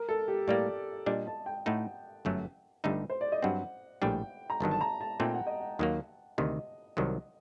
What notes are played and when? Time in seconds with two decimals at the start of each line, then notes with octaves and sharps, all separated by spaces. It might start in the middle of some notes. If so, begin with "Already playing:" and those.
Already playing: A#4
0.09 A4
0.28 G4
0.48 A2 G3 A#3 D5
1.06 A#2 G3 D4 D#5
1.27 A5
1.46 G5
1.66 A2 A3 D#4 F#5
2.25 G1 F#2 F#3 A3
2.84 G1 G2 D3 A3 D#4
3.10 C5
3.21 D5
3.32 D#5
3.42 G2 F#3 C4 F#5
4.01 A#1 A2 G3 D4 G5
4.50 A#5
4.60 G1 G2 D#3 F#3 A5
4.71 A5
4.81 A#5
5.01 A5
5.20 A#2 A3 C4 D#4 G5
5.34 F#5
5.47 D#5
5.60 F#5
5.79 D#2 D#3 F#3 A#3
6.38 D2 C3 D#3 D#5
6.97 C2 C3 D#3 F#3